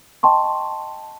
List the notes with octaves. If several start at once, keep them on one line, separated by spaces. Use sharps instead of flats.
D#5 G5 A5 C6 C#6